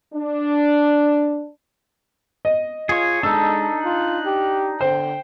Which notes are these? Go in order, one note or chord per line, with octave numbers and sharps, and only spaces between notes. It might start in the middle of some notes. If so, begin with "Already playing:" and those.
D4
D#5
F4 G#4 C#5
G#3 D4 D#4 A4 E6
F4 F#6
G4
D3 C5 G5